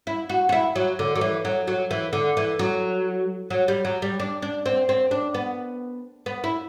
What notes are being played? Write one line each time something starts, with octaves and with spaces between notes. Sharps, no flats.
E4
F#4
F#4
E4
F#3
D3
F#3
E3
F#3
F#3
E3
D3
E3
F#3
F#3
G3
F#3
G3
D4
D4
C4
C4
D4
B3
B3
E4